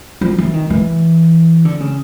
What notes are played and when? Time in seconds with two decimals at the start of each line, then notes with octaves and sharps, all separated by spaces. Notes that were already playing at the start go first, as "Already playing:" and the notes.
0.21 F3
0.38 E3
0.53 D#3
0.70 E3
1.65 D3
1.80 C#3